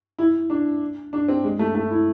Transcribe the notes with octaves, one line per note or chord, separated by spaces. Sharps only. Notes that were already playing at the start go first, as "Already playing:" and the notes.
E4
D4
D4
C4
G#3
A3
A3
E4